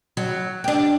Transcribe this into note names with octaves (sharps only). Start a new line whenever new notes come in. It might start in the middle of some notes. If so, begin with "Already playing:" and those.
F#3
D4 G4